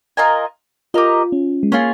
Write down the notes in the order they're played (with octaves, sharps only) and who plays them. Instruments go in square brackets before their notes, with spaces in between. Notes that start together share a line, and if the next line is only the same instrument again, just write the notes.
[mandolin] F4 A#4 D#5 G#5
[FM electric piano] F4 [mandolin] G4 A#4 D#5
[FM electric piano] C#4
G#3
[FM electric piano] A#3 [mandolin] C#4 F4 G#4